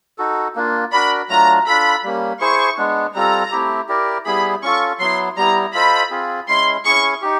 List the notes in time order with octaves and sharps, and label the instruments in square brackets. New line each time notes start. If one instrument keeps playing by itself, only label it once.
[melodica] D#4 F#4 A4
A#3 D4 F4
[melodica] D4 F#4 A#4 D5 [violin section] B5
[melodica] F#3 A3 D4 F4 [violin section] A#5
[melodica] D4 F4 A4 [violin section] B5
[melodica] G3 A#3 C#4
[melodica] E4 G#4 C5 [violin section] C#6
[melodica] G#3 B3 D4
[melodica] G3 C4 F4 A4 [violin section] A#5
[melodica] A3 C4 E4 G4
E4 G4 A#4 D5
[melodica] G3 B3 E4 G#4 [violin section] B5
[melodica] C#4 F4 A4 [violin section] C#6
[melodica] F#3 B3 E4 [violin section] C6
[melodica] G3 B3 E4 [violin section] A#5
[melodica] F4 A4 C5 D#5 [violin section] B5
[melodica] C4 F4 G#4
[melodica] G#3 C#4 E4 [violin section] C6
[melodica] C#4 E4 G#4 [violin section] C#6
[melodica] D#4 G4